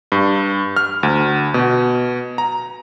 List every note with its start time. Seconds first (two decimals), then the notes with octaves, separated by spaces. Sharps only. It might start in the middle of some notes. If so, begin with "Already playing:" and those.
0.12 G2
0.77 F6
1.03 D2
1.54 B2
2.38 A#5